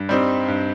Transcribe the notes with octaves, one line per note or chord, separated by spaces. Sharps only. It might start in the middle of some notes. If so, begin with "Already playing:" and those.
Already playing: G2
G3 C4 D#4
G2